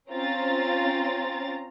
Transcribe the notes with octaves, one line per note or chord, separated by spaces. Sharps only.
C4 C#4 F4 A#5 A6